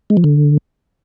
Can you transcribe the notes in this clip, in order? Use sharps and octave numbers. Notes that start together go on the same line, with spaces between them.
G#3
F3
D3